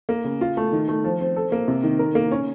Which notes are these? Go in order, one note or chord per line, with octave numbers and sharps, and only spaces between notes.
A#3
C#3
F4
A3
D#3
A3
F3
C4
A4
A#3
C3
D#3
A#4
A#3
C#4